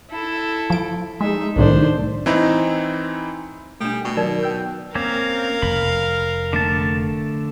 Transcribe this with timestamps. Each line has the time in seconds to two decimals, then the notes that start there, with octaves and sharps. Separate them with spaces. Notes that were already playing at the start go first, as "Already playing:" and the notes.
0.11 E4 A4
0.70 F3 D7
1.21 G#3 D#4 E5
1.56 C2 A2 D#3 D4 C5
2.26 E3 C4 D#4 E4
3.80 B2 G3 A3 D4 A4
4.05 B2 D5 C#6
4.17 D#3 F#3 D#4 A#4 D5
4.42 G5 E6 G6
4.95 A#3 C4 C#4 A#4 F5
5.62 F1 B5
6.53 D3 A3 A5